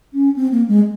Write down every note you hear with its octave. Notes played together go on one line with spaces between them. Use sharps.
C#4
C4
A#3
G#3